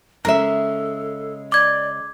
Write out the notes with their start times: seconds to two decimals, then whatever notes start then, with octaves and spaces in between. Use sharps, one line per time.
0.25 C#3 G#3 A4 A#4 E5
1.52 D5 D6 G#6